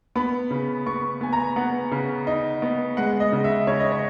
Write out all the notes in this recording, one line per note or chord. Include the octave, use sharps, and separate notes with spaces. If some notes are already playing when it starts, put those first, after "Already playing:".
B3 B5
C#3
B3 C#6
B3 G#5
A#5
B3 F#5
C#3
D#4
B3
G#3 F#5
D#5
C#3
E5
C#3 C#5
D#5
C#5